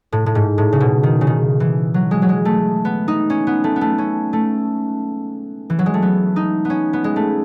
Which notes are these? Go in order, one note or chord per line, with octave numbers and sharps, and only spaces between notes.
A2
A2
G#2
A2
C#3
B2
D#3
C#3
D#3
E3
F#3
G#3
F#3
G#3
A3
B3
D#4
C#4
B3
A3
B3
A3
C#4
A3
E3
F#3
G#3
A3
B3
D#4
B3
C#4
B3
G#3
A3